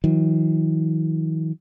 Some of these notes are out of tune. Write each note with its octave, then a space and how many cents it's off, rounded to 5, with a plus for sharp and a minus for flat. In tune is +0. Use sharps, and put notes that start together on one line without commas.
D#3 +45 F#3 -35